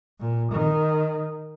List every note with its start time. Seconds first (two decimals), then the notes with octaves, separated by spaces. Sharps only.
0.20 A#2
0.52 D#3